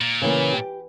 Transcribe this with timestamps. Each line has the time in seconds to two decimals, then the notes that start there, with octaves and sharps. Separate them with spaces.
0.01 A#2
0.22 C#3 E3 A#3
0.53 G4